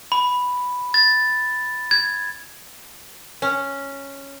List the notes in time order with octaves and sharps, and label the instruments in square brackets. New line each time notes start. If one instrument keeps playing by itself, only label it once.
[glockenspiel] B5
A6
G#6
[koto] C#4